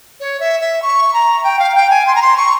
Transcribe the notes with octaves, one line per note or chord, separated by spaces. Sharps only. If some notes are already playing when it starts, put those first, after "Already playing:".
C#5
E5
E5
C#6
A#5
G5
F5
G5
G#5
C6
A#5
C6
C#6